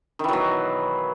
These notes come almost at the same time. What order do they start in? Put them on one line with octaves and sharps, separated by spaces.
D#3 E3 F#3 B2